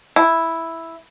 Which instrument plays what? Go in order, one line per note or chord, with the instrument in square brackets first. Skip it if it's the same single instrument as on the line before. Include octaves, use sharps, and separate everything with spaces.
[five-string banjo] E4